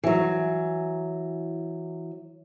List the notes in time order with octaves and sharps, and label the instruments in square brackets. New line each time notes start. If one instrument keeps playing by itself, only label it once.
[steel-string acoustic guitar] E3 F#3